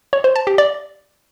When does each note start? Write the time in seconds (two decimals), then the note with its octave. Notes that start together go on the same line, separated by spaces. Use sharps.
0.13 C#5
0.24 C5
0.36 A5
0.47 G4
0.58 D5